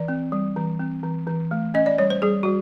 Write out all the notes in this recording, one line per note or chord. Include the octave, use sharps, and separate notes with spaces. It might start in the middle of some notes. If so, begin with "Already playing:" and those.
Already playing: E3 D5
C4
G3
E3
C4
E3
E3
A3
C#4 D#5
D5
G3 C#5
C5
G3 G#4
G3 F#4